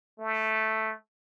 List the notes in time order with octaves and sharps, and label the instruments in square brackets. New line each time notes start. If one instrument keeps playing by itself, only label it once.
[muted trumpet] A3